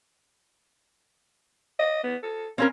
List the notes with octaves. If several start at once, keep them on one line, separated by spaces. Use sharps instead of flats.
D#5
B3
A4
A#3 C4 C#4 A#4